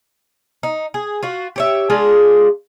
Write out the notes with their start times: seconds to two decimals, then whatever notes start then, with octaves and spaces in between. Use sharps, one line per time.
0.63 D#4
0.94 G#4
1.23 F4 F#4
1.56 G4 C#5 E5
1.90 G#3 D4 F4 G#4